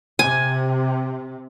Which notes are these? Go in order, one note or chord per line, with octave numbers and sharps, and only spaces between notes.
C3 G#5